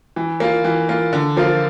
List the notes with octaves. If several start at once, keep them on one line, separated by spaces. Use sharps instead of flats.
E3
A#3 F4
E3
A#3 F4
D3
F3 A#3 F4